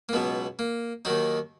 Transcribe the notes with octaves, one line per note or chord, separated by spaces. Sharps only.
A#3
C#2 B2 F#3 B3
A#3
D#2 D#3 F#3 D#4